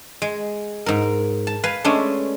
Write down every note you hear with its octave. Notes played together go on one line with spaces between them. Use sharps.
G#3
G#2 A#4
A5
B4 F5 G#5
G#3 A3 C#4 D4